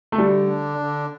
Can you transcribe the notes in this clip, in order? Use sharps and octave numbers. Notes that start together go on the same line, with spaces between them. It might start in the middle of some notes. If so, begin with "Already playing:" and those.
A3
D3 G3
D4
D3